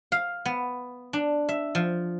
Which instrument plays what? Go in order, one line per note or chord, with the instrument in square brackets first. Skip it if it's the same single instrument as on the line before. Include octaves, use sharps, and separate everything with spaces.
[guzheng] F5
B3
D4
E5
F3